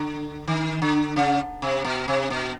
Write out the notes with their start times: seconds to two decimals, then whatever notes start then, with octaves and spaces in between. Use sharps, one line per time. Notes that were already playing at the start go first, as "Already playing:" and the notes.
Already playing: D3
0.48 D#3
0.82 D3
1.16 C#3
1.62 C3
1.85 B2
2.08 C3
2.30 B2